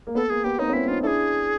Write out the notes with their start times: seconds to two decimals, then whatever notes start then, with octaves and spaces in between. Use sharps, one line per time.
0.07 A#3
0.15 B3 A4
0.30 A#3 G#4
0.44 B3 G4
0.59 A#3 C4 D#4
0.70 C4
0.73 B3 C#4 E4
0.88 C#4 D#4 F4
1.03 D4 E4 G#4 A4